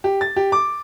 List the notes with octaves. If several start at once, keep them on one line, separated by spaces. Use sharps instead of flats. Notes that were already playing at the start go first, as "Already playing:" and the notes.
G4
A6
G4
D6